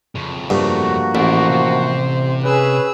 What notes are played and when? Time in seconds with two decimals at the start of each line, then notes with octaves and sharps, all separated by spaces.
0.15 F2 C#3
0.50 G2 F3 A3 A#3 F#4
1.15 A1 E4 C5 D5
1.48 C3
2.43 C#4 G#4 B4 E6